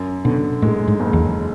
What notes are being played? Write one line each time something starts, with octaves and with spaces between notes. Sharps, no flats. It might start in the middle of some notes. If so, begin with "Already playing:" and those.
Already playing: F#2
B2 D3
A2 G#3
G#2
F#1
E2